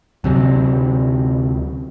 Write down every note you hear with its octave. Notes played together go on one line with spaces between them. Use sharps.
D2 C3 F#3